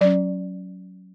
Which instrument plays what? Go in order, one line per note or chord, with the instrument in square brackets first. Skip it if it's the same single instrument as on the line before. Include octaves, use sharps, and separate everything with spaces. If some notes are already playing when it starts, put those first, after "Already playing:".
[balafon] F#3 C#4 D5